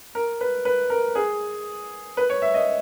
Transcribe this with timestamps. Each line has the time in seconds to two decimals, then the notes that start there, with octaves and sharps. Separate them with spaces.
0.15 A#4
0.41 B4
0.65 B4
0.90 A#4
1.15 G#4
2.17 B4
2.30 C#5
2.42 E5
2.54 D#5